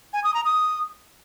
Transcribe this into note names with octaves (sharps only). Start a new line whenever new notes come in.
G#5
D#6
A#5
D#6